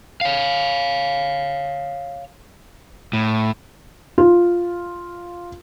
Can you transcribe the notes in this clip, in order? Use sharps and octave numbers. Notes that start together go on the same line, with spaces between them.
C#5 F5
A2
F4